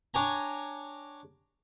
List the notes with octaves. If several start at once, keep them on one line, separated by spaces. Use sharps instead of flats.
D4 C#5 G5 G#5 A#5